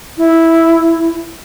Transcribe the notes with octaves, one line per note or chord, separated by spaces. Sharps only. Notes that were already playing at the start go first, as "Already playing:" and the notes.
E4